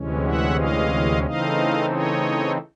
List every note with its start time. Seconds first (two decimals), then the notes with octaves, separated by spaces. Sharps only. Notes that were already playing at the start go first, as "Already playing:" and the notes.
Already playing: D2 C3 E3 G#3 C#4
0.26 E5 F#5
0.59 D#5 F5
1.25 C#3 E3 A3 C4 D#4 D#5 F5
1.92 C#5 D#5